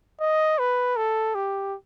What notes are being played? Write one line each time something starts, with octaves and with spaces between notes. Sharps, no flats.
D#5
B4
A4
G4